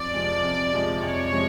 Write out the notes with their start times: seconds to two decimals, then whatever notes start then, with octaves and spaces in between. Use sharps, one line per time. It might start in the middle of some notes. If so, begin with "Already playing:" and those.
Already playing: F2 D5
0.13 C3 F3 G#3
0.43 F2
0.73 C3 F3 G#3
1.03 F2 C#5
1.33 C3 F3 G#3